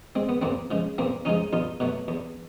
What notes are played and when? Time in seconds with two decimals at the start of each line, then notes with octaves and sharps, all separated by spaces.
0.15 G#3 C4
0.29 B3
0.42 E2 A#3 C4
0.71 C#3 F3 G#3
0.98 E2 A#3 C4
1.25 C#3 F3 G#3 C#4 D#4
1.53 E2 D#4 F4
1.80 B2 F#3 A3
2.08 E2